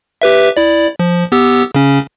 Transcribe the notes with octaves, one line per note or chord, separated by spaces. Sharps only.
G4 B4 E5
E4 D5
F3
B3 G4 E6
C#3 C#4